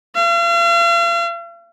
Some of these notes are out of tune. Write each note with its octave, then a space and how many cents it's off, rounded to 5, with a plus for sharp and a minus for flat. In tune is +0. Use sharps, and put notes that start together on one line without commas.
F5 -40